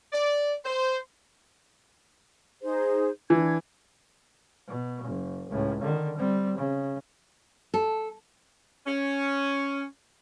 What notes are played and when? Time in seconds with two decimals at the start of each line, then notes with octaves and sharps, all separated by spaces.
0.12 D5
0.64 C5
2.63 D#4 G#4 C5
3.30 E3 D4 G#6
4.68 B2
5.05 F#1
5.50 C#2 A2
5.82 D3 D#3
6.17 G3 C4
6.57 C#3
7.74 A4
8.87 C#4